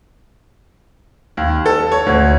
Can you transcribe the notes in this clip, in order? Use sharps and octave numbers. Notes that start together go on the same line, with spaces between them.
D#2
A4
C#5
D2